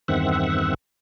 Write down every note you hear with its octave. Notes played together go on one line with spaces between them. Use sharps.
E2 G2 D#3 C4 E5 F#5